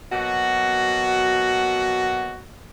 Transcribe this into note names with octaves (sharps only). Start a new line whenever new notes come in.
B2 F#3 A#3 F#4